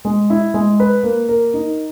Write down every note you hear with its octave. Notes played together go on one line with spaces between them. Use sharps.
G#3
E4
G#3
B4
A#3
A#4
D#4